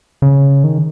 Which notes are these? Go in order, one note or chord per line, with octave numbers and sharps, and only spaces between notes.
C#3
D#3